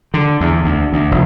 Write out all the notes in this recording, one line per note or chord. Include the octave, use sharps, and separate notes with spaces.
D3
E2
D2
D2
F1